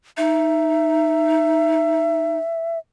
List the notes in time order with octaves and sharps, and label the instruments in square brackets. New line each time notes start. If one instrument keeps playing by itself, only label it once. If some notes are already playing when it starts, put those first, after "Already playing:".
[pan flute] D#4 [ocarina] E5